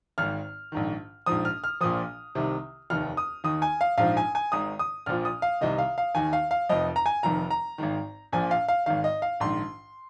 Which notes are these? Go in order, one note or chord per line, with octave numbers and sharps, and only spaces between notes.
G#1 G#2 D#3 F6
A#1 G#2 D#3
A#1 G#2 F3 D#6
F6
F6
A#1 A#2 F3 D#6
C2 C3 D#3
F1 D#2 D#3 F6
D#6
D#2 D#3 D#6
G#5
F5
A#1 G#2 F3 F5
G#5
G#5
G#1 G#2 D#3 D#6
D#6
A#1 A#2 F3 F6
D#6
F5
C2 C3 D#3 D#5
F5
F5
D#2 D#3 G#5
F5
F5
F1 F2 F3 D#5
A#5
G#5
F1 F2 D#3 A#5
A#5
G#1 G#2 D#3
A#1 A#2 F3 G#5
F5
F5
G#1 G#2 D#3 F5
D#5
F5
A#1 G#2 D#3 C6